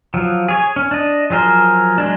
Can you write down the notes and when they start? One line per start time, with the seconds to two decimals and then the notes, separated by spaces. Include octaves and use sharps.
0.14 F3 F#3
0.48 G#4 C#5 G#5
0.76 C#4
0.91 D4 D#5
1.30 F3 F#3 G#4 A#4 C5
1.98 F#3 G#3 D4